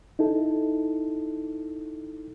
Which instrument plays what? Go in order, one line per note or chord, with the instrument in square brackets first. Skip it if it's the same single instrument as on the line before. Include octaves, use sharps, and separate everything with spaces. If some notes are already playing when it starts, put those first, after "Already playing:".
[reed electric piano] D#4 E4 A4